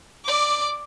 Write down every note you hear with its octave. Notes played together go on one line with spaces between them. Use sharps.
D5 D6